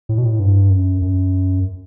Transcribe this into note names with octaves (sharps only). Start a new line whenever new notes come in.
A2
B2
A2
G2
F#2
F#2